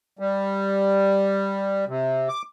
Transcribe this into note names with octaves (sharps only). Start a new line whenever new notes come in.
G3
C3
D6